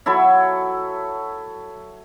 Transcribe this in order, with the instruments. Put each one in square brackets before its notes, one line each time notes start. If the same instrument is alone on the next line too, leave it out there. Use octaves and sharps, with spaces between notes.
[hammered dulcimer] F#3 E4 A4 E5